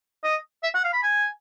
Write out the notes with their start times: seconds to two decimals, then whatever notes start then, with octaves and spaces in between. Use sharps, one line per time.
0.24 D#5
0.63 E5
0.74 F#5
0.84 F5
0.93 B5
1.03 G#5